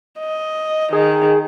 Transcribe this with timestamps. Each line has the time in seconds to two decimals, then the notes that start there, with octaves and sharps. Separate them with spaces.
0.19 D#5
0.93 D#3 G#4